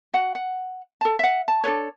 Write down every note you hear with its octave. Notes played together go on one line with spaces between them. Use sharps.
F#4 F#5
F#5
A4 A5
E5 F#5
A5
D4 A4 B4 C#5